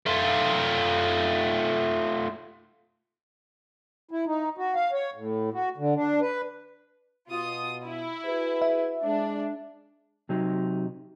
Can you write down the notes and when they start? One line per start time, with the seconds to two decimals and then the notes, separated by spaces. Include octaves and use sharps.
0.06 A3 F4
4.11 E4
4.26 D#4
4.58 F#4
4.75 F5
4.93 C#5
5.14 A2
5.54 F#4
5.77 D3
5.95 D4
6.21 B4
7.29 B2 F4 D#6
7.86 E4
8.26 F#4 G#4 B4
8.62 E5
9.04 G#3 D4
10.29 C3 F#3 C4 D#4